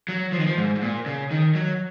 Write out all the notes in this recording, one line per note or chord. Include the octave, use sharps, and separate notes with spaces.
F#3
F3
D#3
F3
G#2
G#2
A#2
C#3
D#3
F#3